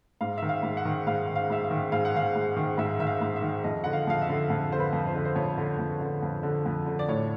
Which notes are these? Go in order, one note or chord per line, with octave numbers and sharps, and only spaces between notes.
G#2 F5
D#3 E5
F5
G#2
F#5
D#3
G#2 F5
D#3
F5
G#2 E5
F5
D#3
G#2 F5
F#5
D#3 F5
G#2
D#3
G#2 E5
D#3 E5
F5
G#2
E5
D#3
F2 D#5
D3 F#5
F5
F2 F5
E5
D3
F2
D3 C5
B4
F2
C5
D3
C5
F2 C#5
D3
F2
D3
F2
D3
F2
D3
D5
A2 C#5